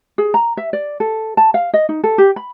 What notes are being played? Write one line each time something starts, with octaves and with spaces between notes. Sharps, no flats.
G#4
A#5
E5
D5
A4
A5
F5
D#5
D#4
A4
G4
B5